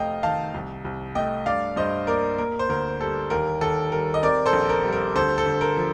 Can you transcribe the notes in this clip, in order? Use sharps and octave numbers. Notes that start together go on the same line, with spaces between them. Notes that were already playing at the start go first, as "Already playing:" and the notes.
Already playing: F1 A3 D#5 F5 G5
D#3 F5 A5
C2
C2
A3 D#5 G5
G2 D5 F5
G2 C5 D#5
A#3 A#4 D5
A#3 A#4
C5
D2 A#4
G3 A4
D#2 A#4
D#2 A4
G3 A#4
D#5
C4 A#4 D5
A4 C5
A#1
A#4
G3
A#4
D2 A4 C5
A4
D2
A#4
F3